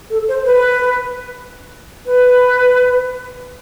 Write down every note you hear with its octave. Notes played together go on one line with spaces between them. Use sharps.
A4
C5
B4
B4